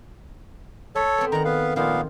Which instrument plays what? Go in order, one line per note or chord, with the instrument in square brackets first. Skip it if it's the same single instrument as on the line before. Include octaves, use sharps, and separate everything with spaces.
[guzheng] A3 [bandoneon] A4 C#5
[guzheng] B3 C4
[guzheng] D#3 D5 F#5 [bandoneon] A#5
[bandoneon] B3 B4 F5
[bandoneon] A#2 B3 F5 [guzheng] D#3 F3 F4